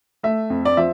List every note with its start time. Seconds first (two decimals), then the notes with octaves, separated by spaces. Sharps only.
0.23 A3 E5
0.50 F2
0.65 D5
0.77 F3 E5